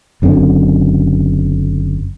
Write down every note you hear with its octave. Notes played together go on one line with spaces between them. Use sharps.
F#1 F#2 D3 C4